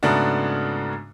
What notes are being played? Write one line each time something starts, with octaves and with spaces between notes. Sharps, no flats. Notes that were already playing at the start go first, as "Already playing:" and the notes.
G#2 C#3 A3 B3 D4 F#4